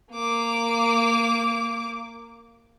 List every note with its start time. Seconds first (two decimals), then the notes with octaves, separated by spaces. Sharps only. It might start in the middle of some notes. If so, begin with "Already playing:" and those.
0.13 A#3 D6